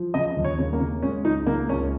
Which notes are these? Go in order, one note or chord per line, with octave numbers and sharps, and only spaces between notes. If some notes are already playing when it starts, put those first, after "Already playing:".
Already playing: F3
C#3 D#5
D#2
C#5
C#3
A#3
C#3
G#3 C#4
C#2 D#4
C#3 A#3
C#2 C#4